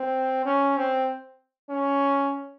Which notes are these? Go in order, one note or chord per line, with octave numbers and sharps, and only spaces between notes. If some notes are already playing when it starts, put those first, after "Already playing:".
Already playing: C4
C#4
C4
C#4